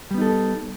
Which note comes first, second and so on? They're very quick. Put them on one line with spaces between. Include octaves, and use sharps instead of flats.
G3 B3 D#4 A4